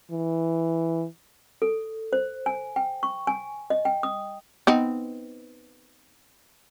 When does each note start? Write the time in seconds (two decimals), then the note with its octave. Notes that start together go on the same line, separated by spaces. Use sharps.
0.11 E3
1.62 A4
2.13 C5
2.46 G#5
2.76 G5
3.03 C#6
3.27 G#5
3.70 D#5
3.85 G5
4.03 D#6
4.67 B3 C4 D#4